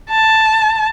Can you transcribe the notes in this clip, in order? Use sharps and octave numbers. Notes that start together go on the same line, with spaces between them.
A5